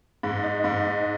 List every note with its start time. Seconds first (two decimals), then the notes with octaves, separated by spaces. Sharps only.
0.23 G#2
0.43 D#4
0.64 G#2
0.85 D#4